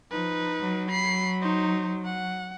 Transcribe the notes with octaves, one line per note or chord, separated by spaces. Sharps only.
F3 D#4 B4
F#3
B5 C7
D#4 C5
F#5